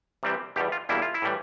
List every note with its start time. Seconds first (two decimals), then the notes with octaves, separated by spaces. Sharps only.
0.23 C3 E3 G3 C4
0.56 E2 B2 G3 G4
0.72 F4
0.89 E2 B2 G3 A#3 E4
1.02 F4
1.14 E4
1.22 A2 E3 G3